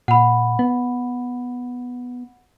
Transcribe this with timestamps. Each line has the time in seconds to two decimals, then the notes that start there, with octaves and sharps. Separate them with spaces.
0.08 A#2 F#5 B5
0.59 B3